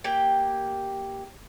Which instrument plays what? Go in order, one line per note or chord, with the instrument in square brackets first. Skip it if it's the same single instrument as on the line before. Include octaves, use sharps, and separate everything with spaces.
[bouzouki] A#3 G4 G5